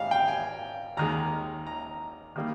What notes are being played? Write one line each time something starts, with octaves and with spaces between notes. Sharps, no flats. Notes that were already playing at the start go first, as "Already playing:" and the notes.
Already playing: G#2 G3 F5
G5
G#5
D#2 D#3 G#3 A#5
A#5
D#3 G3 A#3